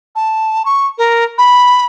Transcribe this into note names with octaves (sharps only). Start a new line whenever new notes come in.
A5
C#6
A#4
B5